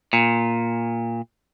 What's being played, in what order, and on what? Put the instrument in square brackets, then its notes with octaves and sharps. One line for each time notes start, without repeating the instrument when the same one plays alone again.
[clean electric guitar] A#2